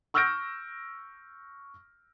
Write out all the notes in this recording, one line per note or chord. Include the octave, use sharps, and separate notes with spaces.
C#6 E6 F6 G6 A#6 D7